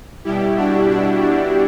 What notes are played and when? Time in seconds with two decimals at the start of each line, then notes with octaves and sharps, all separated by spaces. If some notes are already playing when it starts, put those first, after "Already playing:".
0.24 B2 G3 E4 G4
0.57 D4 F#4
0.90 D4 F#4
1.22 D4